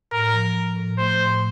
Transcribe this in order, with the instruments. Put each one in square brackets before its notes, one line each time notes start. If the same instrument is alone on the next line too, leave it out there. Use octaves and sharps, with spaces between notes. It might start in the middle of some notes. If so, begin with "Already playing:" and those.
[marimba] A2 [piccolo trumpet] A#4
[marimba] F3
F3
A2
[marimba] A3 [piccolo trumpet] C5
[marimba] A2